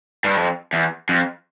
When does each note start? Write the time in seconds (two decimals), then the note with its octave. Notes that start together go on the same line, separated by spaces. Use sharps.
0.24 G2
0.36 F2
0.73 E2
1.09 F2